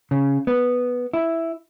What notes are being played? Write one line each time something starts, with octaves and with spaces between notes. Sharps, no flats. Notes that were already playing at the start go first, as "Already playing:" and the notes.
C#3
B3
E4